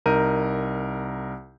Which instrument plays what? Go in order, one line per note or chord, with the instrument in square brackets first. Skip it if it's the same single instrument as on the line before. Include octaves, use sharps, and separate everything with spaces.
[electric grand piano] C2 D#4 A#4 G6 D#7